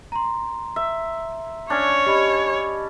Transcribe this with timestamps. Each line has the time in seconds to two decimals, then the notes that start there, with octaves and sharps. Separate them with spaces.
0.12 A#5 C6
0.76 E5
1.70 C#4 D4 C#5
2.06 G4 D#5 B5